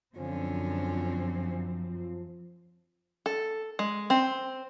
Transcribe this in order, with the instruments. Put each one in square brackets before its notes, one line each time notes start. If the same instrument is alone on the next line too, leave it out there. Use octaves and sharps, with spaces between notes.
[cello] F#2 C4 [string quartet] D3 C#4 [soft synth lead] F3
[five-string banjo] A4
G#3
C4